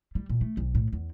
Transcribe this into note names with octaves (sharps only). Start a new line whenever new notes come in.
G3
A#2
A3
B1
A2
E2